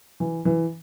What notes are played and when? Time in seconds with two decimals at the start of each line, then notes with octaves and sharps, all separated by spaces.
0.20 E3
0.45 E3